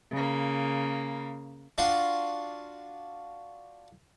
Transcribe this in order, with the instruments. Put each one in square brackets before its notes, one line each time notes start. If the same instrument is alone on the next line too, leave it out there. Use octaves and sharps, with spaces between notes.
[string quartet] C#3 A#3
[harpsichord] D4 F4 F#4 C6